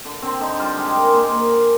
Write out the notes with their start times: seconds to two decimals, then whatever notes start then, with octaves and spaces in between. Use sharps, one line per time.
0.05 D3
0.22 D3 C4
0.40 D3 D#4
0.59 G3 F4
0.78 G#3 G4
0.86 G#4
0.95 G#3 A#4
1.06 D5
1.14 A#2 C5
1.32 A#2 A#4
1.50 D3 G#4